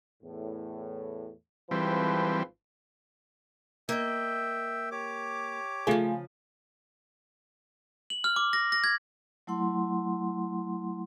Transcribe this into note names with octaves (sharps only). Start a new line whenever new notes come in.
E2 A2
G#1 E3 F3 G3 C4 B4
A#3 D#5 E5 G5
G4 C#5 D6
C#3 F3 A3 F4 G#4
F#7
F6
D6
A#6
A#6
G#6
F#3 A3 E4 F#5 C6